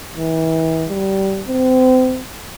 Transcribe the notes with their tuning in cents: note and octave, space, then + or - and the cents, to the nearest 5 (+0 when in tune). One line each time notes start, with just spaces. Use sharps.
E3 -35
G3 -20
C4 -30